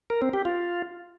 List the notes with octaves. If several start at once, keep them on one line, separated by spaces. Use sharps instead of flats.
A#4
C4
G4
F4